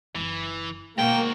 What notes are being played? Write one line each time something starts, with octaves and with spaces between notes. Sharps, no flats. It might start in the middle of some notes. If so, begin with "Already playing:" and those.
F#1 E3 D#4
G#2 B2 A#3 F#4 G5